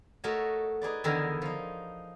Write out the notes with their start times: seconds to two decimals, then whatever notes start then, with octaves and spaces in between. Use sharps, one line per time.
0.24 A3 F#4 A#4 C#5 D#5
0.82 D#4 G#4 B4 D5
1.04 E2 D3 D#3 E4 A#4 A#5
1.42 F3 D#4